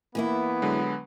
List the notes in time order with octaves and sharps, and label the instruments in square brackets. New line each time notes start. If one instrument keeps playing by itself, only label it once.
[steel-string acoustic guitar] E3 A#3 E4 [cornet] B3
[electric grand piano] D3 F#3 G#3